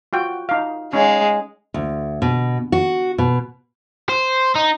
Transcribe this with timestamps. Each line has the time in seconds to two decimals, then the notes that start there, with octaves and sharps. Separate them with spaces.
0.13 F4 F#4 G5
0.49 D#4 F5
0.93 G#3 C#4 D#4 F5
1.74 D2
2.22 B2
2.72 F#4
3.18 B2
4.09 C5
4.56 D#4